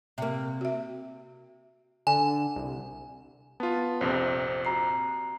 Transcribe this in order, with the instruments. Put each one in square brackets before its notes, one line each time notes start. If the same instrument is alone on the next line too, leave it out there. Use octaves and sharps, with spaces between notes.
[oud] C3 A#3 [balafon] E5
[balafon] F#4 E5
[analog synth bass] D3 [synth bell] G#5
[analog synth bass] C2
[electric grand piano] B3 F4 [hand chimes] A5
[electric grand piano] A#1 F2 C3 [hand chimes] C5
[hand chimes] F#4 A#5 C7